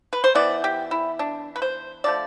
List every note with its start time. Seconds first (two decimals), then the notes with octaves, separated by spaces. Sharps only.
0.13 B4
0.24 C5
0.35 E3 B3 D5
0.64 G4
0.91 E4
1.19 D4
1.56 B4
1.62 C5
2.04 D3 F3 A3 D5